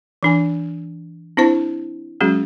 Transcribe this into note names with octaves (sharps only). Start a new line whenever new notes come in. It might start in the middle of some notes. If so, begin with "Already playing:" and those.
E3 D4 G#5
C4 D4 E4 C5 A5
F#3 G#3 C#4 F#4 G#4